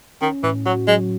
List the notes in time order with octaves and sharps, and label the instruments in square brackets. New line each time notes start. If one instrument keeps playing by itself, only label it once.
[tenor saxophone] D#3 [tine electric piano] C#4
[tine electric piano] A2 [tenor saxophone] E3
[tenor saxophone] F#3 [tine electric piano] F#4
[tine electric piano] F#3 [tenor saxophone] G#3